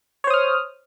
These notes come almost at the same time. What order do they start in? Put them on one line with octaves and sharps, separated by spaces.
C#5 C5 D#6 F6